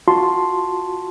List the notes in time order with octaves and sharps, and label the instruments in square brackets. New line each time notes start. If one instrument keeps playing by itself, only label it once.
[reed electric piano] F4 F#4 A5 C6